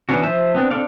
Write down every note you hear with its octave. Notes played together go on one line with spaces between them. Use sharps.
E3 B3 C#4 D4 F#4
F3 C5 E5 A5
B3 C4 D4
C4 D4 A4 D5 F5